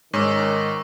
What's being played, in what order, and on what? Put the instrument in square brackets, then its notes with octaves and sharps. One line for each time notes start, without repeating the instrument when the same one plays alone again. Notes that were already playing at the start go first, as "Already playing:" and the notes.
[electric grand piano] G#2 [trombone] D#3 [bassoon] C#4 [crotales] C#6 D6 E6